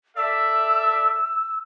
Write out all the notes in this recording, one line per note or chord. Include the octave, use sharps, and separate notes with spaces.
A4 D5 E5 E6